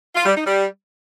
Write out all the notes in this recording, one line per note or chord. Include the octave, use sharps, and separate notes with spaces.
F4
G3
D#4
G3